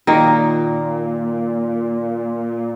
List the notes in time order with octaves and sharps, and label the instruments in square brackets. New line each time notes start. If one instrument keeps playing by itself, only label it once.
[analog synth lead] A#2 [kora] D#3 A#3